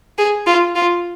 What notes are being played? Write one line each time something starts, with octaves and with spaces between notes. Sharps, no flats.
G#4
F4
F4